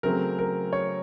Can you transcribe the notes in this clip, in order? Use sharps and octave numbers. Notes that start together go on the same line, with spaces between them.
C#3 F#3 A3 C4 A#4
A#4
C#5